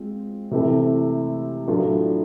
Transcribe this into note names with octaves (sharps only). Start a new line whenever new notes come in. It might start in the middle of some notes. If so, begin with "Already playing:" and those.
Already playing: G#3 C4 F4
C3 E3 A3 C4 E4
A2 F#3 A3 D4 F4